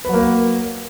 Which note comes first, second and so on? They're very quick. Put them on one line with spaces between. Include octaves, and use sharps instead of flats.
B4 F#3 A#3